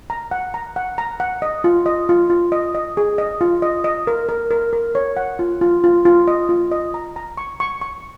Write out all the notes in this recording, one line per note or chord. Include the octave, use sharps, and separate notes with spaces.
A#5
F#5
A#5
F#5
A#5
F#5
D#5
F4
D#5
F4
F4
D#5
D#5
G#4
D#5
F4
D#5
D#5
A#4
A#4
A#4
A#4
C#5
F#5
F4
F4
F4
F4
D#5
F4
D#5
A#5
A#5
C#6
C#6
C#6